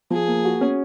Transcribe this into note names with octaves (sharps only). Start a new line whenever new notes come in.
F3 G#4
A#3
F#4
C#4